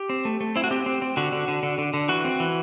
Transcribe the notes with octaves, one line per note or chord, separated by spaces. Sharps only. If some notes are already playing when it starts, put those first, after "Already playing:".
Already playing: G4
C4
A3
A3
C4 E4
F#4
C4 G4
C4
C4
D3 F#4
D3
D3
D3
D3
D3
E3 F#4
C4
E3